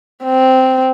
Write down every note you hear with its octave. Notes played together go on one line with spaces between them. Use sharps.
C4